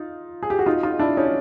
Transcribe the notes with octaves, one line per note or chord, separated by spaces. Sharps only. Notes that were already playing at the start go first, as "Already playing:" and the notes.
Already playing: D#4 F4
G#4
G4
F#4
D#4 F4
D#4 F4
D4 E4
C#4 D#4